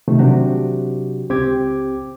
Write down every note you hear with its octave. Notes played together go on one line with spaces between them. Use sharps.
C3 D#3 F3 A3
C3 F#3 D4 F#4 G4
C#2 C4 G4 G5 D6 G#6